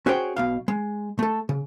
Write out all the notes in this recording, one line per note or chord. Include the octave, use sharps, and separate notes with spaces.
C#4 F#4 G#4 C5 C#5 G5
B1 B2 F5
G#3
A3 A4
C#3